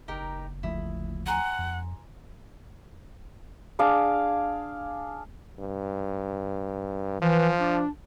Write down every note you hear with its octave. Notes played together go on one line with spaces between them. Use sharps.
F#1 D#4 G4 A#4
D2 F3 A3 E4 D#6
F#5 G#5 A#5 C6
F2
D4 G#4 F5 D6
G2
E3 F3
D4